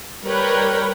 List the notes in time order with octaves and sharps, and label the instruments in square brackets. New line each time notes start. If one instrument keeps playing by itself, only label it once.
[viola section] G3 A#4 B4 C#5 G5